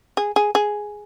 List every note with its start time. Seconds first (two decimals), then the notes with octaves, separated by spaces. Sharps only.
0.17 G#4
0.36 G#4
0.55 G#4